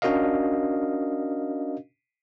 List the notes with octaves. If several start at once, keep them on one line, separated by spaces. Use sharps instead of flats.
C#4 D4 F#4 A#4 D#5 F5